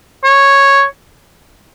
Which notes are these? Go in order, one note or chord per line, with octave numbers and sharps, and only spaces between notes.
C#5